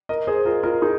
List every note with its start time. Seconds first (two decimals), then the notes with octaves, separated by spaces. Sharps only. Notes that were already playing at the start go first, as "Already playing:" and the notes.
0.09 A#4 D#5
0.27 G#4 C5
0.45 F4 A#4
0.63 F4 A#4
0.81 D#4 G#4